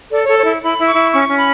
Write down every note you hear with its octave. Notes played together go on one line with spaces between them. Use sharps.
A4 D5
C#5
A4
C#5
E4
E4 B5
E4
C#6
E4
C#4 C#6
C#4
B5